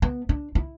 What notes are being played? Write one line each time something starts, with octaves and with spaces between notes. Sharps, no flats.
B3
D4
E4